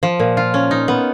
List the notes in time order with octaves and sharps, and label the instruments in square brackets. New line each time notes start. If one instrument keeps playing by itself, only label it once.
[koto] F3
A#2
F4
C#4
D#4
B3